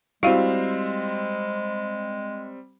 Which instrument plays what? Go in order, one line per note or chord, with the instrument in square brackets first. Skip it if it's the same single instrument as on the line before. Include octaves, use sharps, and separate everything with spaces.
[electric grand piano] G3 C4 [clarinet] G#3 [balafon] E4 F#4 [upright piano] F5